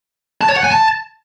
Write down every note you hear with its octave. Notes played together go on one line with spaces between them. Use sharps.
A5
C#5
F#5
G#5
A5